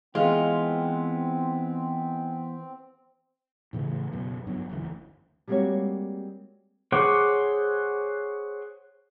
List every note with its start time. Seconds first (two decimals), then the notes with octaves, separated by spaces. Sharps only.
0.15 E3 G#3 B3 C4 F4
3.73 A2 C#3 E3 A3
4.12 C#2 F#2 B2
4.47 G2 F#3 B3
4.69 F#1 D2 E3
5.48 G3 G#3 A#3 C4 F#4 C#5
6.92 G#4 C5 C#5 F#5 D6